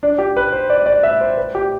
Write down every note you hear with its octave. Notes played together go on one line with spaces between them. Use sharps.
D4
G4
B4
C5
D5
D5
E5
C5
B4
G4